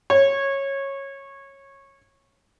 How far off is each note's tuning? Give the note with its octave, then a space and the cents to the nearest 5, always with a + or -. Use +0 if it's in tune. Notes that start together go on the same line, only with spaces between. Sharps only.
C#5 -15